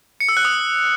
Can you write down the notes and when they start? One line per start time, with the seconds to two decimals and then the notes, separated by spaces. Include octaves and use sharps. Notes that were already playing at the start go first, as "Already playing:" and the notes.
0.20 C#7
0.29 E6
0.37 F#6
0.45 D#6